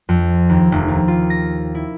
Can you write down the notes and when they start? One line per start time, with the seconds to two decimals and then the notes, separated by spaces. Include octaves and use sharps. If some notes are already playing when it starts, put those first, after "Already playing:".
0.09 F2
0.49 D#2
0.72 F1
0.88 D#2
1.08 F4
1.30 A#6
1.75 E4